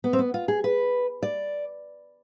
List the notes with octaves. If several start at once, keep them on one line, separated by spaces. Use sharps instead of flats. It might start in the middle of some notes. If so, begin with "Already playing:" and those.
B3
C4
B3
F4
G#4
B4
D5